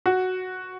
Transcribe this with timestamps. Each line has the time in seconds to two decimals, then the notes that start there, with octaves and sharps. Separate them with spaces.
0.06 F#4